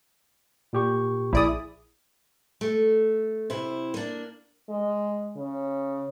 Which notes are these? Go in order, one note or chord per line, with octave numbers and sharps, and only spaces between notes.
A#2 G4 C#6
A#1 E4 G#4 D5 D#6
A3
C3 E4
A#3 D4
G#3
C#3